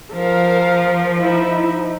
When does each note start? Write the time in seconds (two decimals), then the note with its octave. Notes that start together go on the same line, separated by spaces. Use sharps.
0.13 F3 A#4 F5
1.17 D#4 E4